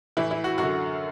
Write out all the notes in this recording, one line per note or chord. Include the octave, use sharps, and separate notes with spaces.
A2 E3 E4
E4
F#4
F#2 F#4
D3